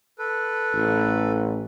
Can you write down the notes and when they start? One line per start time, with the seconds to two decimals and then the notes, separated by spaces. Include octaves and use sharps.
0.19 A4 B4
0.75 A1